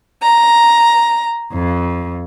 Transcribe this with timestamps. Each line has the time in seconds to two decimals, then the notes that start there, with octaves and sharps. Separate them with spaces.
0.23 A#5
1.54 F2